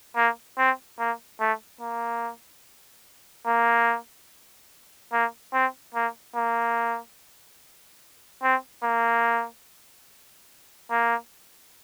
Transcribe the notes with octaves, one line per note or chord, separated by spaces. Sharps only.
A#3
C4
A#3
A3
A#3
A#3
A#3
C4
A#3
A#3
C4
A#3
A#3